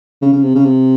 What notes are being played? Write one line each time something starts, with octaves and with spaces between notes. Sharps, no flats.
C#3
C#3
C3
C#3
C3